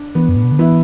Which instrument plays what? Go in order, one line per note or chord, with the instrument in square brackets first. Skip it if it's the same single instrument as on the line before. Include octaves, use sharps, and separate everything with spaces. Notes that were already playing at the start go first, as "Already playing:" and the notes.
Already playing: [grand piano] D4
[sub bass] E3 [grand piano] B3
[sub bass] F#2
A2
B2
D3
[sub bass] E3 [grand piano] B3 E4